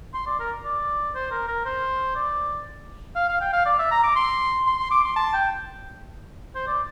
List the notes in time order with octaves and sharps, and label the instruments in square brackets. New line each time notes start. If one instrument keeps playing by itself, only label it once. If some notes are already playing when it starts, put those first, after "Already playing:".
[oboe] C6
D5
A#4
D5
C5
A#4
A#4
C5
D5
F5
F5
G5
F5
D5
E5
A#5
D6
C6
C6
C6
D6
C6
A5
G5
C5
D5